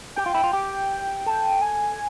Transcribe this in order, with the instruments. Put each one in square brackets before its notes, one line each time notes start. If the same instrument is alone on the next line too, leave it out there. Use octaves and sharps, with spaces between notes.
[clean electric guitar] G4 [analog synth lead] G5
[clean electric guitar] F4
E4
F4
G4
A4
[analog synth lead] G#5